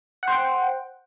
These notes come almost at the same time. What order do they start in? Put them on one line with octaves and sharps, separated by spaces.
F#5 C5 G5